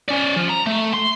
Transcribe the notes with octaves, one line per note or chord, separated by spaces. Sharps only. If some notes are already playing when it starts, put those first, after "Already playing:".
C#4 D5
F3
A#5
A3
C6